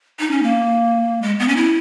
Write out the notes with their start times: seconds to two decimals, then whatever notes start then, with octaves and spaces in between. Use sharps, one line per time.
0.20 D#4
0.31 C#4
0.43 A#3
1.22 G#3
1.39 B3
1.48 C#4
1.56 E4